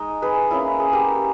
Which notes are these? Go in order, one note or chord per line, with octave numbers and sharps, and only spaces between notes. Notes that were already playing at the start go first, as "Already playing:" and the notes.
Already playing: G#3 D#4 D#5
G#4 B4
A#3 C#4 E4
G#4
G4 A#4